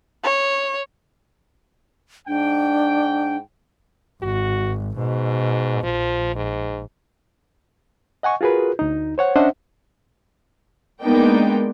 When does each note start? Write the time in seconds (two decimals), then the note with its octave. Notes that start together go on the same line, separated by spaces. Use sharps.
0.24 C#5
2.28 G#2 D4 G5
4.22 G#1 F#4
4.97 G#2 B2
5.83 A#1 F3
6.35 G#2
8.23 D#5 F#5 G#5 C#6
8.41 F4 F#4 G#4 A#4 B4
8.79 D2 D#4
9.18 C5 C#5 F#5
9.36 C#4 D4 C5 D#5 E5 F#5
11.02 G#3 A#3 B3 D4 D#4 G5